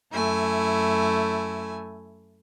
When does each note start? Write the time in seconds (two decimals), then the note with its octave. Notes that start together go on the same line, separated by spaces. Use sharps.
0.13 F#2 A3 E4 G#5